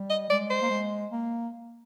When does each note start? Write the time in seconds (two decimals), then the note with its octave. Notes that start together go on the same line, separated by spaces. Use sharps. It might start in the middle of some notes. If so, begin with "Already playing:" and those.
Already playing: G3
0.10 D#5
0.30 G#3 D5
0.50 C5
0.62 A#3
0.70 G#3
1.12 A#3